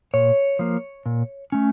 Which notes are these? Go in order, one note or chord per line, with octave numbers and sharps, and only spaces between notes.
A#2 C#5
F3 A#3
A#2
A3 C#4